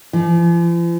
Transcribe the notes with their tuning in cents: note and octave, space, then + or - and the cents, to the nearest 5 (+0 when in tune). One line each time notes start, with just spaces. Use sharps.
F3 -45